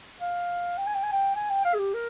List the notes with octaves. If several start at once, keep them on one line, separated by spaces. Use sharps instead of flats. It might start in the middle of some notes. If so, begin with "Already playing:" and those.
F5
G5
G#5
G5
G#5
G5
G#5
G5
F5
G#4
G4
A#4